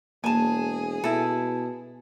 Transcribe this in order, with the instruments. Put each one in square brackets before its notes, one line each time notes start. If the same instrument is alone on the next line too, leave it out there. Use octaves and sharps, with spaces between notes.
[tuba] E1 [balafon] A#3 [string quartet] G#4 [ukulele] G#5 A5
[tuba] B2 [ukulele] E4 A4